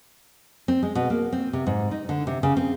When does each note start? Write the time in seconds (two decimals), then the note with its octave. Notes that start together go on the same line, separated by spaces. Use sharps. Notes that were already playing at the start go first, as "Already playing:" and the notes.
0.68 C4
0.83 G#3
0.95 B2
1.10 A#3
1.33 C4
1.53 C3
1.67 G#2
1.91 D#4
2.09 D3
2.27 C3
2.43 C#3
2.57 C4